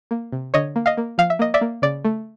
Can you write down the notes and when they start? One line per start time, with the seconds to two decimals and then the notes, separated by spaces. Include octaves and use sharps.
0.11 A#3
0.32 C3
0.54 D3 C#5 D#5
0.76 A#3
0.86 D#5 F5
0.97 A#3
1.18 F3 F5
1.30 E5
1.39 A#3 D#5
1.54 D5 E5
1.61 A#3
1.82 C#3 D5
2.05 A3